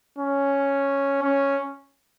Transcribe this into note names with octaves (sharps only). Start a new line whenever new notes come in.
C#4
C#4